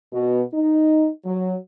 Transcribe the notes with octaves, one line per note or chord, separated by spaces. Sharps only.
B2
D#4
F#3